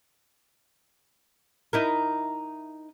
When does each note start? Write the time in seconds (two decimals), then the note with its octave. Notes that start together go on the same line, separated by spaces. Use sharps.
1.73 D#4 E4 A#4